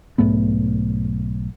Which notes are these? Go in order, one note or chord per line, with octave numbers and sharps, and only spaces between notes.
B1 G#2 A3 B3